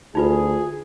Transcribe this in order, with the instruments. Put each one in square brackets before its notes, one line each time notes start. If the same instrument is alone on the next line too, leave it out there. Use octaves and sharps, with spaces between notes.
[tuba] D2 [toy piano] D#4 F4 B4 [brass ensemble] G#4